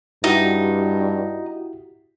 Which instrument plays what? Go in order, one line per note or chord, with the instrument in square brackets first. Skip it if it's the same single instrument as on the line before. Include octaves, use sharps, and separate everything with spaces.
[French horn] G2 [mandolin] D#4 [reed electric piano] E4 F#4 G4